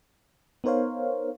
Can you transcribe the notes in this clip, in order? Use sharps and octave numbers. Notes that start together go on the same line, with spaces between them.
B3 D#4 A#4 C5 C#5 F5